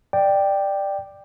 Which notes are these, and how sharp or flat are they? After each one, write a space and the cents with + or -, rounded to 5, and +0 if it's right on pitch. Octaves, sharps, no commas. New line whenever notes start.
D5 +15 G5 +0